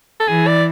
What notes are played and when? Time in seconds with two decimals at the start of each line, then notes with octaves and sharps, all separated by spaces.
0.20 A4
0.28 E3 G#4
0.47 D5